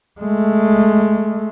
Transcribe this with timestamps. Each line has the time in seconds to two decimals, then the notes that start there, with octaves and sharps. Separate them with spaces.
0.21 G#3 A3